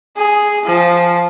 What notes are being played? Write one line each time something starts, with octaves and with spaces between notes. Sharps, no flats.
G#4
F3